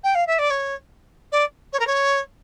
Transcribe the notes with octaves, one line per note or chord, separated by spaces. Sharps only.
G5
F5
E5
D5
C#5
D5
C#5
A#4
C#5